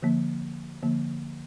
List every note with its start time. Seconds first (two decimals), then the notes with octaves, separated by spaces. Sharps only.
0.02 D3 F3 A#3
0.82 D3 F3 A#3